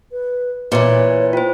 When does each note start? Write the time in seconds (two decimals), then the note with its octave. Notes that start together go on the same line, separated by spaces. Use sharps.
0.12 B4
0.72 A#2 E3 B4 C#5 C#7
1.33 F4 C5 G5